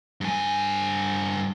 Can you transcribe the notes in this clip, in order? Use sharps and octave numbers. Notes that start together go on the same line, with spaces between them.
G2 G#5